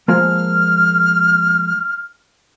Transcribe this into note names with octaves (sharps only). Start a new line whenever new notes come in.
F3 G#3 A#3 F6